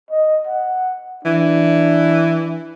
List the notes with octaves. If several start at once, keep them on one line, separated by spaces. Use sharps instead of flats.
D#5
F#5
E3 D4